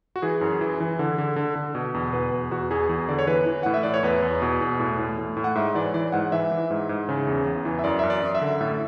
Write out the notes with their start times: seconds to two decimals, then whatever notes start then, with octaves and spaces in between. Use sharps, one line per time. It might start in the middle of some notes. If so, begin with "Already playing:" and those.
0.16 F#4
0.22 E3 G#4
0.41 F#2
0.61 E3
0.80 E3
0.99 D3
1.18 D3
1.36 D3
1.56 D3
1.75 B2
1.94 E2
2.13 B2 B4
2.32 E2
2.51 E2 F#4
2.71 E2 G#4
2.89 E2 G#4
3.09 D3 D5
3.19 C#5
3.27 E3 B4
3.46 E3
3.63 A2 F#5
3.74 E5
3.83 A2 D5
3.94 C#5
4.03 E2 B4
4.22 E2
4.42 B2
4.61 E2
4.80 A2
4.98 A2
5.18 A2
5.37 A2
5.44 F#5
5.55 G#2 E5
5.75 E3 D5
5.86 C#5
5.94 E3 D5
6.12 G#2 F#5
6.32 E3 E5
6.51 E3
6.70 G#2
6.89 G#2
7.09 C#3
7.27 E2
7.46 E2
7.65 E3
7.79 E5
7.84 F#2 D5
7.99 F#2 E5
8.10 D5
8.22 F#2
8.35 E5
8.41 D3
8.60 A2 E5